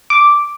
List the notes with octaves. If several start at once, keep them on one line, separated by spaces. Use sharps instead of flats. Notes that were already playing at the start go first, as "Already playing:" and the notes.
D6